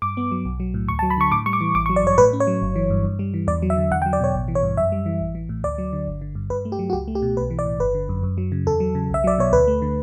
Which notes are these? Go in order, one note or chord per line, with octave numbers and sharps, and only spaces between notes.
G2 D6
B3
F#3
B1
F#3
A2
D2 C#6
A5
F#3
B5
D3 C#6
A2 D6
G3 C#6
D6
E3
A1 D6
C#6
F#3
D5
G2 C#5
A2 B4
C#4
C#5
F#3
G1
E3
G2
G2
G3
E3
E2 D5
F#3
E5
D3
E2 F#5
G5
F#3
D5
B2 C#5
A1
E3
C#5
G2
F#2 E5
G3
E3
A1
E3
A2
D2 D5
F#3
D3
G1
D3
G2
G2 B4
A3
G4
F#3
F#4
C#2 G4
A3
G4
B2
B1 B4
E3
D5
A2
G1 B4
D3
F#2
F#2
F#3
C#3
E2 A4
F#3
C#3
B1 E5
F#3 D5
B2 C#5
D2 B4
A3
D3